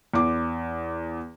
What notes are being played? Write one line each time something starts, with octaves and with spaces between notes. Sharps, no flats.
E2 D6